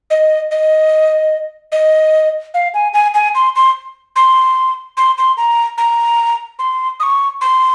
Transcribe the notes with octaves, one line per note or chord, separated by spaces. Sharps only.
D#5
D#5
D#5
F5
G#5
G#5
G#5
C6
C6
C6
C6
C6
A#5
A#5
C6
D#6
C#6
C6